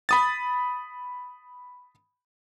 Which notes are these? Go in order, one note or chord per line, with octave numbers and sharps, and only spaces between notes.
B5 D#6 A6